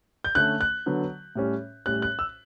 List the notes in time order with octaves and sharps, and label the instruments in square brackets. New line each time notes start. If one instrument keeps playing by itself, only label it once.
[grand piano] G6
D3 A3 C#4 F#6
F#6
D3 F#3 B3
A2 G3 C#4
A2 G3 C#4 F#6
F#6
E6